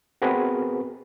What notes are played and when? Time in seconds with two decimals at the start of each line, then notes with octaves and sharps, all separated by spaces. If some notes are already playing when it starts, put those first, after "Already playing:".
0.22 B3 C4 F#4 G#4 A#4 B4